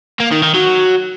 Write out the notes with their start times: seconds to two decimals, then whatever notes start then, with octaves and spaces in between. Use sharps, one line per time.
0.20 A#3
0.31 D#3
0.43 D#3
0.54 F#3